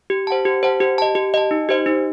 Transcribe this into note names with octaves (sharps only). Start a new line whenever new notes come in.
G4
C5 F#5 A5
G4
C5 F#5 A5
G4
D#5 A5
G4
D#5 A5
D#4
G4 C5 D#5
D#4